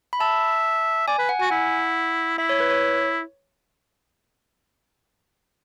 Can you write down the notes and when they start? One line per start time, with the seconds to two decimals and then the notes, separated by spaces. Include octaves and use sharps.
0.13 B5
0.20 E5 A5
1.08 D5 G#5
1.19 B4
1.29 F#5
1.39 F#4 G#5
1.50 E4 F#5
2.38 E4 E5
2.49 C#5
2.60 B4
2.71 C#5